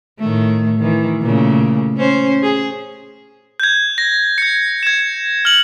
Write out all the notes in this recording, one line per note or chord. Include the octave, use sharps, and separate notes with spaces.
A2 D#3 A3
D#3 E3
A#2 C#3 A3
C#4 C5
G#4
G6 G#6
A#6
G#6 C#7
G#6 E7
F6 F#7